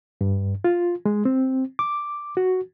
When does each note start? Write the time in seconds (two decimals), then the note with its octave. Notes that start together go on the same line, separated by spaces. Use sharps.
0.21 G2
0.64 F4
1.06 G#3
1.25 C4
1.79 D6
2.37 F#4